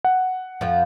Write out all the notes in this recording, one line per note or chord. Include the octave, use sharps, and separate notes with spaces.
F#5
F2 F3